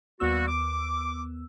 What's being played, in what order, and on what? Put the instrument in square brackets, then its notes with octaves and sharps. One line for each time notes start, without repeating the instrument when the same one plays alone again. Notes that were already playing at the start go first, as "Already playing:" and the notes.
[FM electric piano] D#2 B3 E6 [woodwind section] G3 A#3 F#4
[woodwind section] D6